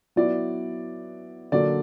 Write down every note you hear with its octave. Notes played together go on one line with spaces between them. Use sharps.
F#3 B3 E4 D5
D3 F#3 A#3 D5